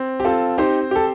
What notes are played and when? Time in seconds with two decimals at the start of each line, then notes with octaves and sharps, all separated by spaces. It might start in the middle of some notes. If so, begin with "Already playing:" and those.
Already playing: C4
0.20 G4
0.24 C4 F4 A4
0.58 D#4 G4 C5
0.91 G4 A4